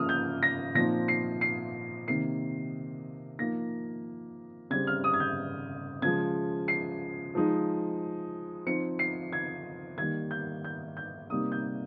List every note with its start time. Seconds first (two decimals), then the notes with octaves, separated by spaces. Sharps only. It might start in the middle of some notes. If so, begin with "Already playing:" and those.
Already playing: C#3 F3 A#3 D#6 F6
0.09 G6
0.43 A#6
0.75 A#2 F3 C4 D#4 A#6
1.08 C7
1.41 C7
2.07 C3 D#3 A#3 D#4 C7
3.39 F3 A#3 D#4 A#6
4.70 C#3 G3 C4 G#6
4.87 F6
5.04 D#6
5.14 G#6
5.20 G6
6.02 C#3 F3 G#3 G#6
6.68 C7
7.35 F3 G#3 D#4
8.66 F3 C4 D#4 C#7
8.99 C7
9.33 G#6
9.98 D#3 G3 A#3 G#6
10.31 G6
10.64 G6
10.97 G6
11.30 C3 G3 A#3 D#4 D#6
11.52 G6